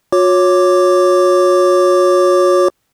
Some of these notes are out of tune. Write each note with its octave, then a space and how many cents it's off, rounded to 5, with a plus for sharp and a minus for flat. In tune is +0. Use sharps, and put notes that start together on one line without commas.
F#4 -45 C#5 +0 D6 +0